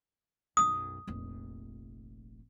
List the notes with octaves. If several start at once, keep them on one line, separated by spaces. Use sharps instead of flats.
B1 F#2 D#6
F1 A#1